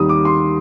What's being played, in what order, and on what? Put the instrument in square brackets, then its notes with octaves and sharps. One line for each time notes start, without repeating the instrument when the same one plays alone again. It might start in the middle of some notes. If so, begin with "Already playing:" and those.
Already playing: [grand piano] D#2 D#3 G3 D#6
D6
C6